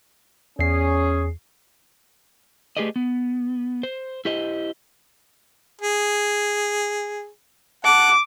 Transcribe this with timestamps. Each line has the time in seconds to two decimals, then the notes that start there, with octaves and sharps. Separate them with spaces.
0.59 E2 C#4 G#4 C7
2.77 A3 G4 G#4 B4 D5 D#5
2.96 B3
3.83 C5
4.25 E4 G4 C5 D#5
5.81 G#4
7.85 F#5 A5 D6